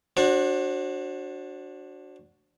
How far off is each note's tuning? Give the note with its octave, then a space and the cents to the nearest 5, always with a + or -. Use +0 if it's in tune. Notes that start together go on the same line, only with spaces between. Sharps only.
D4 +0 F#4 +0 C5 +35